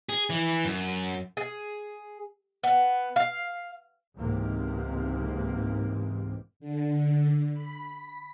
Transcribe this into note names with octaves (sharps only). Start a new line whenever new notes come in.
G#4
E3
F#2
G#4
B3
F5
C#2 G#2 C3 E3 A#3
D3
B5